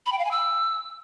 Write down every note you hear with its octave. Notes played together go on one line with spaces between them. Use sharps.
B5
G5
F5
G#5
E6